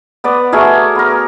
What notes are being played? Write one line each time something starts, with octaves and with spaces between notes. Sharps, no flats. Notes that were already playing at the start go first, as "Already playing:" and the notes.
B3 B4 D5
A3 F#4 G#4 A#4
B3 A#4